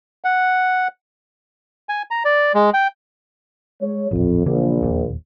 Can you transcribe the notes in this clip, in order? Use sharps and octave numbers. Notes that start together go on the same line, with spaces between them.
F#5
G#5
A#5
D5
G#3
G5
G#3 C#5
D#1 A1 F2
A#1 C#3 E3 A#3
E1 D#2 A#2